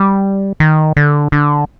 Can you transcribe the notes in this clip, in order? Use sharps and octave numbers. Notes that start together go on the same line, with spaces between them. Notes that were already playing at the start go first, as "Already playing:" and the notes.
Already playing: G3
D#3
D3
D3